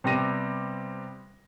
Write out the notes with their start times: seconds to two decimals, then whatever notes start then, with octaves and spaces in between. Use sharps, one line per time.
0.04 C3 G3 B3 C4 A#6 D#7